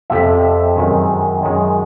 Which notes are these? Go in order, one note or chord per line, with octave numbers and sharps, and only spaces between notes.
F2 C3 F3 E5
F#2 D#3 G#3
F#2 D#3 G#3